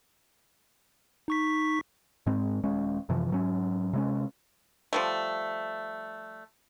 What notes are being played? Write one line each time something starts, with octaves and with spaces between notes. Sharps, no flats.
D#4 C#6 B6
G#2 G#3 C4
D#1 G#3 C#4
F#2 C3 E3 F3
G#2 F#3 C#4
C3 G#3 C#4
F3 G3 A3